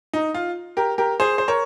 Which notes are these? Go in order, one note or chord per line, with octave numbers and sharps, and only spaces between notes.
D#4
F4
G4 A#4
G4 A#4
G#4 C5
C5
A#4 C#5